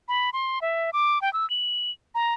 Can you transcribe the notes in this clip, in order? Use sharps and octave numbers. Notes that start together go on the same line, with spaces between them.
B5
C6
E5
D6
G5
E6
F#7
A#5